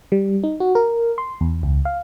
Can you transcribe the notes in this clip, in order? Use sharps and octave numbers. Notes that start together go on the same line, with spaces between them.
G3
D#4
F#4
A#4
C6
E2
C#2
F5